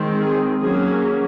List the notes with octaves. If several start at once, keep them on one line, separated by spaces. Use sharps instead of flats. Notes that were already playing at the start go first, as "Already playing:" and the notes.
Already playing: D#3 G#3 C4
G#4
F#3 A#3 C#4 G#4